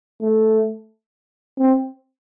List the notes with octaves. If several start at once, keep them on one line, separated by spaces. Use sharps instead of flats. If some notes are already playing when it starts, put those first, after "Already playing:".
A3
C4